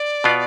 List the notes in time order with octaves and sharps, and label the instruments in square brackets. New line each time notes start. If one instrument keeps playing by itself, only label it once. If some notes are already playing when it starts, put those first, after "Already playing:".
Already playing: [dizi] D5
[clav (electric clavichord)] B2 B3 F4